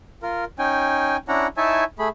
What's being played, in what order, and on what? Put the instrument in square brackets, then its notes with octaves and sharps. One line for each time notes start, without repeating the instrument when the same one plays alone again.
[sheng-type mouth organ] F4 A#4
C#4 D#4 G5 G#5
C#4 D4 E4 F#5 A#5
D#4 E4 C#5 E5 G#5 A5
A3 G#4 B5